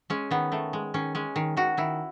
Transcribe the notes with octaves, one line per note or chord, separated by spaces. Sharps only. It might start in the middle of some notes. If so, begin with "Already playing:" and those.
G#3 C#4
D#3 B3
D#3 A3
G#3
D#3 C#4
G#3 C#4
D#3
D#3 F#4
D#3 E4